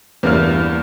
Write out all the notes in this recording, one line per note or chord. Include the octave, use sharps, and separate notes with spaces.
E2 G2 A#3 E4 F6